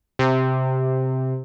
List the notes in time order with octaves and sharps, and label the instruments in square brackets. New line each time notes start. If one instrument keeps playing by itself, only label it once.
[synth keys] C3